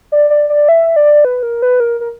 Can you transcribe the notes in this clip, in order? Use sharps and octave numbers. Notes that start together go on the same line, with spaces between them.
D5
D5
D5
E5
D5
B4
A#4
B4
A#4
A#4